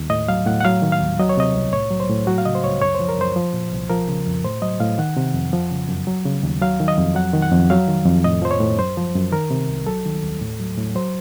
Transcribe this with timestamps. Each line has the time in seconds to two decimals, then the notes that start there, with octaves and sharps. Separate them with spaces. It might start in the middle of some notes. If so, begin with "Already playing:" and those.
Already playing: D#2
0.10 A2 D#5
0.28 F#3 F5
0.46 A2 F#5
0.60 F#5
0.65 F#3 F5
0.82 D#3
0.92 F5
1.01 D#2
1.19 F#3 D#5
1.29 C#5
1.37 C3 D#5
1.54 C2
1.73 A2 C#5
1.91 F#3
2.00 C5
2.10 A2
2.27 F#3 F#4
2.38 F5
2.46 C#3 D#5
2.55 C5
2.64 C#2 C#5
2.82 F#2 C#5
2.95 C5
3.00 F3
3.09 A#4
3.18 F#2 C5
3.36 F3
3.53 A#2
3.72 C2
3.90 F3 A#4
4.09 C#3
4.27 F2
4.44 A2 C5
4.62 F#3 D#5
4.80 A2 F5
4.98 D#3 F#5
5.17 C3
5.34 F2
5.53 F3
5.71 C#3
5.88 F#2
6.07 F#3
6.25 C#3
6.43 D#2
6.62 F#3 F5
6.80 D#3
6.88 D#5
6.98 F2
7.15 F#3 F#5
7.33 D#3
7.42 F#5
7.52 F2
7.70 F#3 F5
7.88 D#3
8.06 F2
8.24 A2 D#5
8.42 F3 C5
8.51 C#5
8.61 A2
8.79 F#2 C5
8.97 F3
9.15 F#2
9.32 D#3 A#4
9.51 C3
9.69 C2
9.87 F#3 A4
10.06 D#3
10.23 D#2
10.42 A2
10.60 F#3
10.78 A2
10.95 F#3 C5